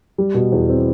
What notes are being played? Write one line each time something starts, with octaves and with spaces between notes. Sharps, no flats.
G3
B2
E2
C4